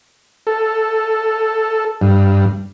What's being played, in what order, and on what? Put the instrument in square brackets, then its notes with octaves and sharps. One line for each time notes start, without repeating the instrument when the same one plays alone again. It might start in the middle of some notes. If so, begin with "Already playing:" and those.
[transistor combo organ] A4
G2